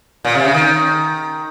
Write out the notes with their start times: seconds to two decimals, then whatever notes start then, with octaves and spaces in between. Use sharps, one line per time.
0.25 A#2
0.35 C3
0.45 C#3
0.54 D#3